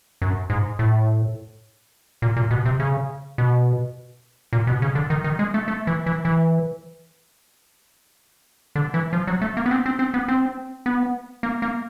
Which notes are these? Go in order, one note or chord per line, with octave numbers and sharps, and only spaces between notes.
F#2
G#2
A2
A#2
A#2
B2
C3
C#3
B2
A#2
B2
C#3
D3
D#3
D#3
G#3
A3
A3
E3
E3
E3
D3
E3
F3
F#3
A3
A#3
B3
C4
C4
C4
B3
C4
B3
A#3
A#3